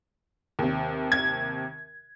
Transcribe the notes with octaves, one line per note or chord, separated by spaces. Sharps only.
D#2 C3
G#6